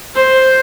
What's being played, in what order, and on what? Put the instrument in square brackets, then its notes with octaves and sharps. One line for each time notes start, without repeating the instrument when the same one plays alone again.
[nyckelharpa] C5